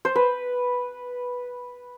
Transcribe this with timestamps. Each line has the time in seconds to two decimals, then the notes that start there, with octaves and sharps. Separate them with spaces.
0.05 C5
0.16 B4